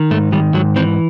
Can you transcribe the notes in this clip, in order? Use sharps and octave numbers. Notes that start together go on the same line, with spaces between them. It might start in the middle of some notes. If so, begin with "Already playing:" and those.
Already playing: D#3
G#2 A3
D#3 G3
G#2 F#3
E3 C4